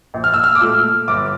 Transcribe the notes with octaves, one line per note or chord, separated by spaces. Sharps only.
A#1
F6
E6
F6
D6
A#2 A3 E6
G1 D6